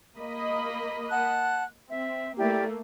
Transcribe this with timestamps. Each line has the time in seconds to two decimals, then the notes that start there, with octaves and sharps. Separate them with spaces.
0.18 A#3 D#5 B5
1.10 F#5 A5 F#6
1.89 C4 E5
2.38 A3 A#3 E4 G4 D5